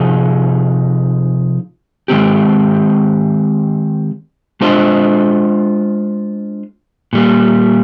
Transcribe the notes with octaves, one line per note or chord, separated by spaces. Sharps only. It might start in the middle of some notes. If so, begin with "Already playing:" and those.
Already playing: C3 F3 D#4 G#4
D#3 G#3 C4 G4
G#3 D4 F4 C5 D#5
A#2 G3 A#3